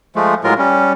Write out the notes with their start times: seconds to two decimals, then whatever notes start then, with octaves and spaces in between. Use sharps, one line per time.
0.16 F3 G#3 A3
0.44 A2 F#3 G#3 F4 A#4
0.58 G3 C#4